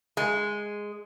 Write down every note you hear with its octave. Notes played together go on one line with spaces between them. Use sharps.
G#3